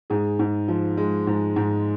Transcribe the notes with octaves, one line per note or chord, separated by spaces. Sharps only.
G#2 G#4
G#2
F3
G#3
G#2
G#2